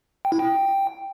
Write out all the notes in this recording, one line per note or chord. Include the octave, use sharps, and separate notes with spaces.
G5
E4
G5